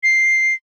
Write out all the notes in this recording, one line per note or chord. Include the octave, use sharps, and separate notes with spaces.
C7